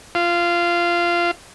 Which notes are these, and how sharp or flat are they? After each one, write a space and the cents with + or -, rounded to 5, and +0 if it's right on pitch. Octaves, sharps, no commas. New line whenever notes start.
F4 -15